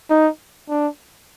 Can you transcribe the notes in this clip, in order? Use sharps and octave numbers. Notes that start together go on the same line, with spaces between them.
D#4
D4